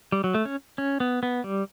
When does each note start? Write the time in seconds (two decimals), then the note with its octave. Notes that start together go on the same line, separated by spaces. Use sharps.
0.12 G3
0.24 F#3
0.34 A3
0.45 C#4
0.78 C#4
1.00 B3
1.23 B3
1.44 G3